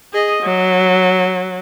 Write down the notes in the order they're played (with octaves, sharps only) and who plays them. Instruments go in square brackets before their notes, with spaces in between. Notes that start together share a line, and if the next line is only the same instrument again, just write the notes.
[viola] G#4 D#5
F#3